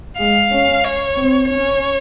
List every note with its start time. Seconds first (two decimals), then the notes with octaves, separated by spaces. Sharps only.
0.19 G#3 F5
0.51 C#4
0.84 C#5
1.16 C4
1.49 C#4 C#5